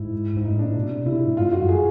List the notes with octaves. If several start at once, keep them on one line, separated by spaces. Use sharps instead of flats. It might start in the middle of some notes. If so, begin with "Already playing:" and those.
Already playing: G#2 E4
G#2
D#4
A2
A#2 D4
B2
C3
C3 E4
B2
G#2
G2 F4
F#2 F#4
G#4